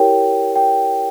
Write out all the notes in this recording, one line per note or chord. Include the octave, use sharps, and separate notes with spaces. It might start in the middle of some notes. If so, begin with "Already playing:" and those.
Already playing: E4 G4 A#4 C#5 G5
G5